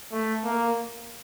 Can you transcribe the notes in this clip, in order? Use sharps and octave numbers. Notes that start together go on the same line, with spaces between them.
A3
A#3